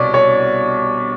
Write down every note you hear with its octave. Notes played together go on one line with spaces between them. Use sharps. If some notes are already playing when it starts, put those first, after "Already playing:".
Already playing: C2 B2 C#5 D5
C#5